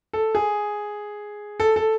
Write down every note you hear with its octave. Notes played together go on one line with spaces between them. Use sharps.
A4
G#4
A4
A4